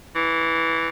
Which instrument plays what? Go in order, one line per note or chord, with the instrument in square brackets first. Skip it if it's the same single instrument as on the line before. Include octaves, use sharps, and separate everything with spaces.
[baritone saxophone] E3